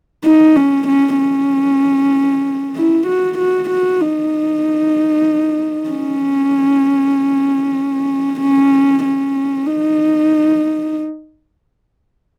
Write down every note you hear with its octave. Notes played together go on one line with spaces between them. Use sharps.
D#4
C#4
C#4
C#4
E4
F#4
F#4
F#4
D#4
C#4
C#4
C#4
D#4